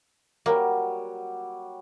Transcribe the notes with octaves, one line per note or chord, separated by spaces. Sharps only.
F#3 G3 A#3